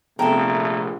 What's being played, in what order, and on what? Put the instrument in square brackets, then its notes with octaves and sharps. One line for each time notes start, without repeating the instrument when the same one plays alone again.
[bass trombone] A#1 [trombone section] C3 A3 [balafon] B3 G5 A5 [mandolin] A4 A#4